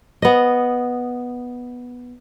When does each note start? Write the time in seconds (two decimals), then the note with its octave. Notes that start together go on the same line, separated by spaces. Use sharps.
0.22 B3 D#5